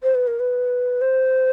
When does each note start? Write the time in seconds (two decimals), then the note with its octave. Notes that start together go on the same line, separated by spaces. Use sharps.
0.03 C5
0.15 B4
0.27 A#4
0.40 B4
1.01 C5